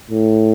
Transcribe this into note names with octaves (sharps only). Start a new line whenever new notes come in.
A2